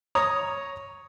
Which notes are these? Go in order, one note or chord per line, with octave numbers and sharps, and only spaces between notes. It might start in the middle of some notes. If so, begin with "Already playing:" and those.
C#5 A#5 D#6